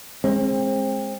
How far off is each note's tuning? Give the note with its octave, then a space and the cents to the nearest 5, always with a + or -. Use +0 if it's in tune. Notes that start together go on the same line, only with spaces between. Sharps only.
G#3 +0 C4 +25